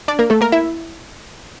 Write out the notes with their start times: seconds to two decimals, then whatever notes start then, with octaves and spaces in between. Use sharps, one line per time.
0.08 D4 D5
0.19 A#3 A#4
0.30 A3 A4
0.41 A#3 A#4
0.52 E4 E5